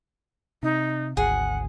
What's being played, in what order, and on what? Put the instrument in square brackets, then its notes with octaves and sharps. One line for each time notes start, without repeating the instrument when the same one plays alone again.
[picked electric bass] C3 [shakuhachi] D#4
[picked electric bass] G#1 D2 [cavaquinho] G#4 [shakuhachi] F#5